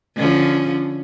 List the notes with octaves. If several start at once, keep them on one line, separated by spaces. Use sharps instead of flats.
D3 F3 C#4